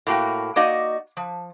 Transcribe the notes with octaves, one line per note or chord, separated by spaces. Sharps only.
A2 A#3 F#4 G5
A#3 D#4 F#4 D5 D#5
F3